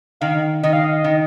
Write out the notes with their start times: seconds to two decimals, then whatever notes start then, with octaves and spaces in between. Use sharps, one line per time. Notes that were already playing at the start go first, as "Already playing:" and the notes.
0.21 D#3 F5
0.63 D#3 D#5
0.73 F5
0.84 D#5
1.04 D#3